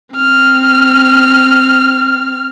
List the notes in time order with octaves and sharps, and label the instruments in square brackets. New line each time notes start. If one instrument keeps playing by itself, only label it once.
[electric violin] C4 F6